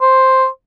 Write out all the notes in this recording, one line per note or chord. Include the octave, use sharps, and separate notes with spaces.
C5